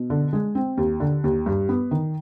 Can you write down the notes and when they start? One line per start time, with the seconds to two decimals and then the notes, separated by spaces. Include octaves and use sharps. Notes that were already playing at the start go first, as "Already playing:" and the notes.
Already playing: B2
0.10 D3
0.33 G#3
0.55 C4
0.77 D#2
1.00 D3
1.24 D#2
1.46 G2
1.69 B3
1.91 D#3